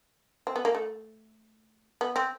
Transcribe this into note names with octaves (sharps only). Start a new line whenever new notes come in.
C4
B3
A#3
A3
B3
C4